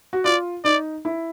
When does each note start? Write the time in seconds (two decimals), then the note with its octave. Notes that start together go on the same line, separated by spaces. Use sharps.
0.13 F#4
0.25 F4 D5
0.64 D#4 D5
1.05 E4